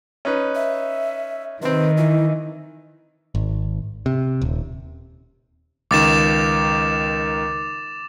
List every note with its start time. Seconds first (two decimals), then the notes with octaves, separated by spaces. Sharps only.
0.25 C#4 D#4 B4
0.55 E5
1.62 C3 D#3 C4 B4
1.97 E3 E4
3.35 G#1
4.06 C3
4.41 D#1
5.91 C#2 D#3 D6 A6 E7